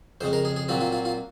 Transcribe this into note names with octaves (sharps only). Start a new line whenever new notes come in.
F2 C#3 G#3 C5
A#4
G#4
G#4
A#2 F#3 C4 F4
F4
F4
F4